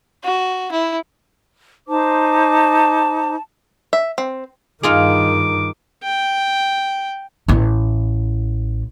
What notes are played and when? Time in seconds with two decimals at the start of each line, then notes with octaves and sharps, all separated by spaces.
0.24 F#4
0.72 E4
1.88 D#4 C5 A5 D6
3.93 E5
4.18 C4
4.83 G2 D#3 D#4 F4 G#4 D6
6.03 G5
7.48 A1 E4